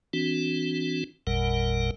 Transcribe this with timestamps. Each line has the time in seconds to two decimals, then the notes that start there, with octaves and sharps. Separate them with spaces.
0.13 E3 C4 D4 F#4
1.27 G#1 E2 A#2 G3 A#4 F#5